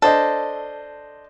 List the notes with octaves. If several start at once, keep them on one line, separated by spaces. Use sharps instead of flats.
D4 A4 C5 D#5